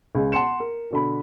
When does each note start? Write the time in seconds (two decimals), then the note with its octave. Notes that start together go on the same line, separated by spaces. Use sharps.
0.15 C#2 G#3
0.32 F#5 A5 C6 C#7 E7
0.60 A#4
0.91 B2 D3 B5